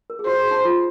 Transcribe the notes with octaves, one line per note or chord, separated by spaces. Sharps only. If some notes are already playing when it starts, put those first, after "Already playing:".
A#4
G#4
F#4 C5
G#4
D#4
F4